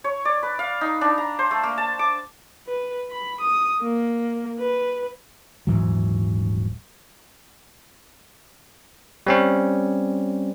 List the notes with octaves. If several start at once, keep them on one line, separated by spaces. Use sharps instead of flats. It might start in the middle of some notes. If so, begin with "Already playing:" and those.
C#5
D5
B4
F5
D#4
D4
A#5
C5
A3
A#3
A5
D6
B4
B5
D#6
A#3
B4
D#1 G#2 E3 F#3
G3 C4 C#4